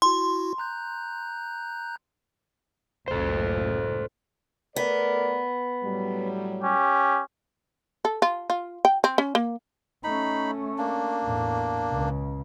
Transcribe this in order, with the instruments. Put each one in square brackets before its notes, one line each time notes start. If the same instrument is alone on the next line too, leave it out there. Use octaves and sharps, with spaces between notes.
[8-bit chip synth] E4 F#4 [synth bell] C6
[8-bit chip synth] A#5 F#6 G6
[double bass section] F#1 C#2 A2 [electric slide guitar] A4 C5
[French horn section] A3 A#4 D5 [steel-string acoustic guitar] B3
[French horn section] A2 F#3 G3
[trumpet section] C#4 G4
[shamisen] A4
F4
F4
G5
C4
C#4
A#3
[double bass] A3 C#4 [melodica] D#4 B5
[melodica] A#3 D4
[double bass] E2 A2
C#2 C#3